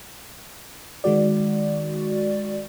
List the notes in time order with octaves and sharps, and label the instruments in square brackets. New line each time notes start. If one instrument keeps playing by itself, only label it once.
[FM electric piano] D#3 G#3 F#4 D5